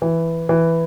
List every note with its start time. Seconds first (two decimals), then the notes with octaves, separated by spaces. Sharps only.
0.02 E3
0.49 E3